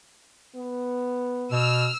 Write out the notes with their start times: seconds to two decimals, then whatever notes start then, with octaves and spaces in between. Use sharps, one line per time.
0.56 B3
1.52 B2 E6 F6